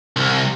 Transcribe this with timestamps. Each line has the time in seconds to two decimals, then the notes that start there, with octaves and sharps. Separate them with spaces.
0.16 C2